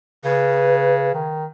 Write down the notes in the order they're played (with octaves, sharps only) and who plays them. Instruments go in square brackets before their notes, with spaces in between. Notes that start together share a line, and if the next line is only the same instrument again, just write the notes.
[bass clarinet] C#3 [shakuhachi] B4
[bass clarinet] D#3